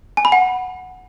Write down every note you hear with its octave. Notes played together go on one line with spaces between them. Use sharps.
G#5
B5
F#5